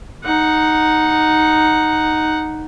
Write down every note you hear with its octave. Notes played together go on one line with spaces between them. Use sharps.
D#4 F#5